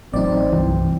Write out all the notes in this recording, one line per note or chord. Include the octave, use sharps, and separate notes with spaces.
A1 F#3 C4 D#4 D5
C2 G2 E3